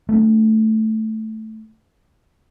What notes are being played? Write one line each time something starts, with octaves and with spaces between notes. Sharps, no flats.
A3 B3 D4